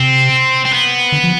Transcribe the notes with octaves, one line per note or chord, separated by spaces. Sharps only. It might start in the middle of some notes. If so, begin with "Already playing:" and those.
Already playing: C3 C4
C4
B3
D3
F3